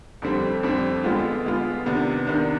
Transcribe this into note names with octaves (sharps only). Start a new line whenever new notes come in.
F2 D3 G3 C4
F2 D3 G3 C4
D3 G#3 B3 F4
D3 G#3 B3 F4
C3 D#3 B3 D4
C3 D#3 B3 D4